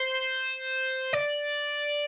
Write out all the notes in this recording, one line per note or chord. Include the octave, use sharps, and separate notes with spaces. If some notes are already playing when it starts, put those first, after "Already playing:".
Already playing: C5
D5